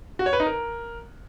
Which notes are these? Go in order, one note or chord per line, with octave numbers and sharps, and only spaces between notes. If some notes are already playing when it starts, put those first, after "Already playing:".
F#4
C#5
B4
D#4
A#4